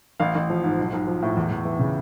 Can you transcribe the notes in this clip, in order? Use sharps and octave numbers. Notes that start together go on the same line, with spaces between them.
A1 F5
A1
F3
G#2
B1
B1
F3
A2
E2
E2
E3
C#3